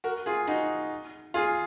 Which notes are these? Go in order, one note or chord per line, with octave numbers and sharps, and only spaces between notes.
F#4 A#4
F4 G#4
D#4 F#4
F4 G#4